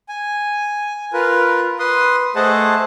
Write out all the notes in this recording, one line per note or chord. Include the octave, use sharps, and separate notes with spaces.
G#5
F4 A#4 B4
B4 C6 D#6
A3 G#4 C5 D#5 F#5 A5